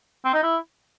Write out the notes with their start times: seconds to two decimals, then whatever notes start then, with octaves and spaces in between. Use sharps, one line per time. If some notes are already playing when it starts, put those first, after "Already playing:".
0.25 C4
0.34 D#4
0.43 E4